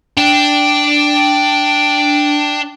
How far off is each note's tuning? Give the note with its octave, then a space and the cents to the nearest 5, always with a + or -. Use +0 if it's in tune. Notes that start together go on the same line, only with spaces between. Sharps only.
D4 +0 G5 +0